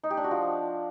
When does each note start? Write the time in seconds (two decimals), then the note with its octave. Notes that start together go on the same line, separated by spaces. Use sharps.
0.03 D#4
0.10 G4
0.17 D4
0.24 F#4
0.31 F3